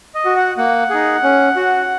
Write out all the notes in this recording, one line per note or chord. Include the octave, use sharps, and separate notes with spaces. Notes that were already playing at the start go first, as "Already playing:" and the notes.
D#5
F#4
F#5
A#3 F#5
D#4 G#4
C#4
F#4